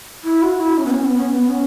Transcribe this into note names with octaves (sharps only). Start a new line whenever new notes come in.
E4
F#4
E4
C#4
B3
C#4
B3
C#4
B3
C#4